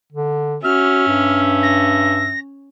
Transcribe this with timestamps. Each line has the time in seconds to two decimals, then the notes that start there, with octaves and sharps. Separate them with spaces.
0.12 D3
0.64 C#4 F#4 E5 F6
1.09 G2
1.63 A#6